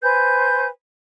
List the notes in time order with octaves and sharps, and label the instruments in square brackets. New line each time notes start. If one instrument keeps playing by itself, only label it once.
[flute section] B4 C5 G#5 G6